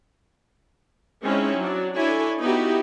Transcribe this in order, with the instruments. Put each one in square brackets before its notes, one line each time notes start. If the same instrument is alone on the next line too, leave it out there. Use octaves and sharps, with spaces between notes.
[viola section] G#3 C4 C#4 D#4 E4
F#3 D4
D4 E4 A4 C#5 G#5
B3 D#4 E4 F#4 G4